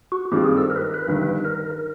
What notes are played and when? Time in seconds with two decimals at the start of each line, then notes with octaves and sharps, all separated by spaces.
0.12 F#4
0.32 G2 D#3 G#3 C4 F4 G4
0.44 G#4
0.57 A4
0.70 A#4
0.76 B4
0.82 A#4
0.94 B4
1.07 G1 G2 D#3
1.45 A#4